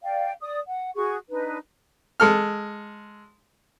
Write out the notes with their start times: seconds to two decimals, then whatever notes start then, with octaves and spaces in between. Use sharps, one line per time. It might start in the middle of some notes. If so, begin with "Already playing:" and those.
0.02 D5 F5 G5
0.41 D5 D#6
0.67 F#5
0.95 F#4 G#4 C#6
1.29 D4 D#4 B4
2.20 G#3 A4 F6